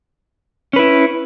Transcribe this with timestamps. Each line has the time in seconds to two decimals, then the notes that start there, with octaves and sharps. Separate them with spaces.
0.73 C#4
0.76 B4
0.79 E4